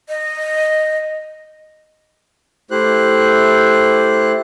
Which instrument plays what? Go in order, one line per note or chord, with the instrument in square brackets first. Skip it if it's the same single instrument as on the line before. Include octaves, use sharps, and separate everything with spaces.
[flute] D#5
[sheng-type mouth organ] A3 E4 G4 C5 F#6